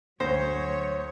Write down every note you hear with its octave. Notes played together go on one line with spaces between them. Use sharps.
D2 F#3 C5 C#5 A#6